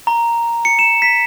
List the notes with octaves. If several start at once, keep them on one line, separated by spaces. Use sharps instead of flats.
A#5
C#7
E7
B6